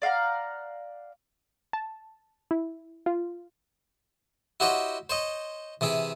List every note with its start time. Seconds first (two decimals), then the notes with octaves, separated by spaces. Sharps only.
0.02 D5 F5 F#5 A#5
1.73 A5
2.51 E4
3.06 F4
4.60 E4 F#4 G4 C5 C#5 D#5
5.10 C5 C#5 D#5
5.81 C3 E3 E4 G#4